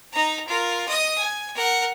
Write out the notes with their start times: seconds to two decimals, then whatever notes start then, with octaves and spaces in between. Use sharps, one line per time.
0.12 D#4 A#5
0.48 F4 A#4
0.88 D#5 D#6
1.18 G#5
1.55 A#4 F#5